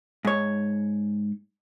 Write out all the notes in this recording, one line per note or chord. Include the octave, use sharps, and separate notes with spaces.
G#2 C#5